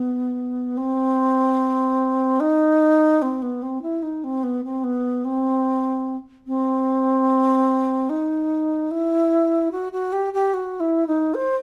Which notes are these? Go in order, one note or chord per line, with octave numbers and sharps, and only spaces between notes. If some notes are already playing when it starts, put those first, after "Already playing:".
Already playing: B3
C4
D#4
C4
B3
C4
E4
D#4
C4
B3
C4
B3
C4
C4
D#4
E4
F#4
F#4
G4
G4
F#4
E4
D#4
C5